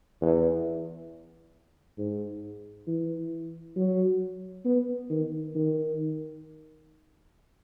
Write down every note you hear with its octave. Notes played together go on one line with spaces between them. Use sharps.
E2
G#2
E3
F#3
B3
D#3
D#3